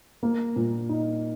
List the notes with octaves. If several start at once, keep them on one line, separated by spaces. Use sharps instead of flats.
A#3
A#2
D#4